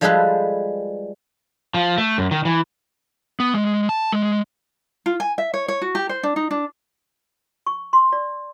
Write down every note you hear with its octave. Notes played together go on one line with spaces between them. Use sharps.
F3 G3 G#3 G#4 A4 B4
F3
A3
F#2
D#3
E3
B3
G#3
A5
G#3
F4
G#5
E5
C#5
C#5
F#4
G4
C5
D4
D#4
D4
C#6
C6
D5